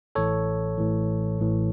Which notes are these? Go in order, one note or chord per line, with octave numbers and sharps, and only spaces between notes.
A1 A2 E3 A4 C#5
A1 A2 E3
A1 A2 E3